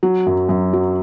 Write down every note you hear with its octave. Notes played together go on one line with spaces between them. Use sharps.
F#3
F#2
F#2
F#3